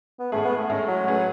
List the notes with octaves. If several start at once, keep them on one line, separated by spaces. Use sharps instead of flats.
B3
A2 G#3 A3 C#4 G#4
B3
A3
A2 G#3 A3 C#4 G#4
F#3
A3 C#4 G#4 B4